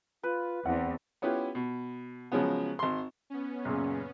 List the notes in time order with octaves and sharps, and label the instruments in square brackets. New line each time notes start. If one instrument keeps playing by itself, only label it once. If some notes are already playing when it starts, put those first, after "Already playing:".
[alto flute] F4 [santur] B4
[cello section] E2 [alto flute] C4 [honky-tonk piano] F#5
[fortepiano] B3 C#4 E4 F4 G4 B4
B2
C#3 F3 F#3 G#3 B3
G#1 C6
[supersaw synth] B3 C#4
[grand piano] F#2 A#2 C#3